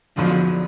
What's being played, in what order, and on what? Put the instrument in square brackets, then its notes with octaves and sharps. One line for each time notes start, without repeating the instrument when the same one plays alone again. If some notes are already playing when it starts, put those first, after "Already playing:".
[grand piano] A#1 G#2 F#3 B3 F4 [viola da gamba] D3 F3